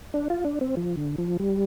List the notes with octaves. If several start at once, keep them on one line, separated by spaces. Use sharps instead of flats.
D4
F4
D4
C4
F3
D3
F3
G3